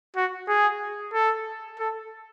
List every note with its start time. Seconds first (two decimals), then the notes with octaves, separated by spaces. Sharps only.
0.16 F#4
0.48 G#4
1.14 A4
1.80 A4